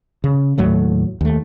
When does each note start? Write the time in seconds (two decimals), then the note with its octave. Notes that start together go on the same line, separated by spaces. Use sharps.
0.24 C#3
0.58 D#2 A2 F#3 A3
1.21 D#2 A3